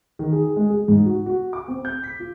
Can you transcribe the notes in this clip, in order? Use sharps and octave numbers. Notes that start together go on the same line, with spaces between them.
D#3
G#4
G#3
G#4
G#2
F#4
F#4
D6
C4
G6
B6
F4